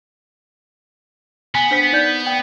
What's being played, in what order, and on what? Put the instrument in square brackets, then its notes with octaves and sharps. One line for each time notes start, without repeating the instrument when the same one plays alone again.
[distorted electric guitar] B3 [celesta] G#5
[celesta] D4 C5 B6
D#4 D5 G6
G5